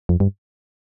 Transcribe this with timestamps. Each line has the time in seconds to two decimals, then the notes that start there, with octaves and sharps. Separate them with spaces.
0.09 F2
0.20 G2